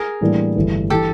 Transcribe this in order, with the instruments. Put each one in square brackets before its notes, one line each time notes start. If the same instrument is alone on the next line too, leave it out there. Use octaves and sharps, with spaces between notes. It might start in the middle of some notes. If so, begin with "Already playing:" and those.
Already playing: [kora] G#4 A#4
[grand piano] A2 E3 G3 A#3 D4
G1 G2 E3 A3
[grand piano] E3 [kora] G4 A4